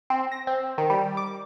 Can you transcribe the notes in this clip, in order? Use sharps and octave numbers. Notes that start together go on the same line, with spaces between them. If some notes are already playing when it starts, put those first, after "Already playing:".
C4
A#6
C4
D#3
G3
D6